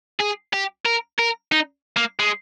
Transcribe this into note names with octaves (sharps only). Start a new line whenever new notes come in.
G#4
G4
A#4
A#4
D#4
A#3
G#3